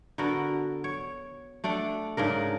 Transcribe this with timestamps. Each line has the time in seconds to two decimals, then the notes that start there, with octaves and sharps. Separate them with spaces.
0.18 D3 B3 F#4 A#4
0.84 C#5
1.64 A3 D4 D5 F#5
2.17 G#2 C#3 D4 A#4